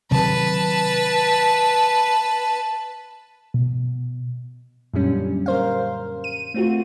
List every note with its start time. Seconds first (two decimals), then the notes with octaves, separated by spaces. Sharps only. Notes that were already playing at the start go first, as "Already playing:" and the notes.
0.11 C3 D#3 F#3 B4 A5
3.54 B2
4.94 F#2 A#2 D3 G3 C#4
5.46 A#4 C5 F5
6.24 D#7
6.54 A3 C4 F4 F#4